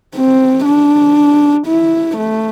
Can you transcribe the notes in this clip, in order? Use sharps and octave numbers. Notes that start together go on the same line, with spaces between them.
C4
D4
E4
A3